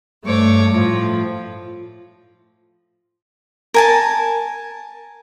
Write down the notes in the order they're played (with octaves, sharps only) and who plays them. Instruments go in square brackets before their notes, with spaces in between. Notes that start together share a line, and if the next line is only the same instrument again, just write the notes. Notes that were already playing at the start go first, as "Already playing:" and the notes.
[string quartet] G2 A3 C#5 D6
A2 F3
[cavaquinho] A#4 G#5 A5